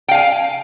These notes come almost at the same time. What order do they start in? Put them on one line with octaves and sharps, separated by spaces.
G5 F5 G#5